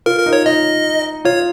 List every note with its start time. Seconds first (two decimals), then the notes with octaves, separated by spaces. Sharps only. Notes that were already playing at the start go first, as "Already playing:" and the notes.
0.06 F4 A#4
0.19 A#4
0.26 D#4
0.33 C#5
0.46 D#4 D#5
1.25 F4 C#5